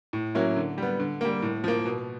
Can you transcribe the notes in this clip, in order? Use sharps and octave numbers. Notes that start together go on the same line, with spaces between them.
A2
F#3 A#3 C#4 E4
D3
G3 B3
D3
G3 A#3
A2
F3 A#3
B2